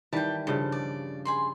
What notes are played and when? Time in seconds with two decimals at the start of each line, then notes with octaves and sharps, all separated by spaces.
0.13 D#3 E3 G3 G5 A5
0.47 G2 C#3 F3 A4
0.72 D5
1.25 G#4 B5 C6